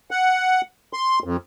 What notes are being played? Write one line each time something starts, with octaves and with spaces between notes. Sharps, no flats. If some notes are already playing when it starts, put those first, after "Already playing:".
F#5
C6
F2